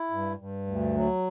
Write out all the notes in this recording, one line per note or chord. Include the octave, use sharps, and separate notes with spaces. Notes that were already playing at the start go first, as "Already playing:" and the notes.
Already playing: E4
G2
G2
D2
F#3